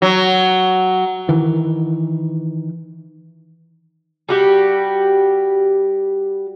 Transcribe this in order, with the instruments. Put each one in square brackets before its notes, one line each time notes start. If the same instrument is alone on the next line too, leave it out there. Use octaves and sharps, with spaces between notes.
[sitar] F#3
[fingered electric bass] D#3 E3
[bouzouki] G3 F#4 G4